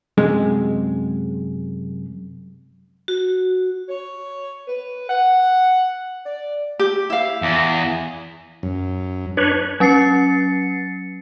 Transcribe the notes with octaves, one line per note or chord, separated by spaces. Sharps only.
F#2 C3 G#3
F#4
C#5
B4
F#5
D5
G4
E4 F5
E2
F#2
D4 B4 C#5
F#3 C#4 A6 C7 C#7